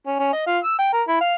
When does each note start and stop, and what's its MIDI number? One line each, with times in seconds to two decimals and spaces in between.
0.07 0.18 61
0.19 0.32 61
0.32 0.44 75
0.46 0.58 65
0.64 0.76 88
0.79 0.92 79
0.93 1.02 70
1.08 1.17 64
1.21 1.34 77